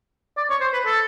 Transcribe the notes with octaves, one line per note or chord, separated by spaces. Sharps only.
D5
C#5
C5
B4
A4